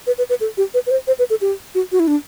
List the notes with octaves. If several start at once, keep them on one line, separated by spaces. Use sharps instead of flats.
B4
B4
B4
A4
G4
B4
B4
C5
C5
B4
A4
G4
F#4
F#4
E4
D4